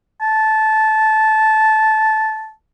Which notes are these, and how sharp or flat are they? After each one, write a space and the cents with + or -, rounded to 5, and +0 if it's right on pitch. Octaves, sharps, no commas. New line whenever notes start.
A5 -15